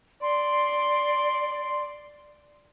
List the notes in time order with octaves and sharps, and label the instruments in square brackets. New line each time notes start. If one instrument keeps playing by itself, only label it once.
[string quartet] D5 [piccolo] C6